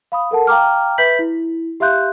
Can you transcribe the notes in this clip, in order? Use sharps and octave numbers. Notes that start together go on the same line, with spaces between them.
F5 B5 D#6
A4 A#4 F#5 A5
F5 G5 A#5 D6 F6
B4 E5 B5 G6 B6 F#7
E4
G4 E5 F5 C6 F#6 G6